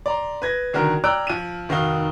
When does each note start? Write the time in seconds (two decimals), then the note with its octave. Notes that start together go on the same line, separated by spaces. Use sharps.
0.06 D5 A#5 C6
0.42 B4 G#6 A#6
0.73 C2 D3 D#3 F#4 A#4 F6
1.04 D5 G5 A#5 E6 F#6 D7
1.27 F3 D#7
1.69 F1 D#3 D#4 F#4 F5 G7